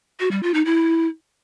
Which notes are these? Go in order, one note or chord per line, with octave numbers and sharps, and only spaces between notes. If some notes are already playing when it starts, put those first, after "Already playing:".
F#4
G3
F4
D#4
E4